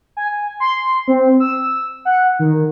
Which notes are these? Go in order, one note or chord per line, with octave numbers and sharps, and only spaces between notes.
G#5
C6
C4
E6
F#5
D#3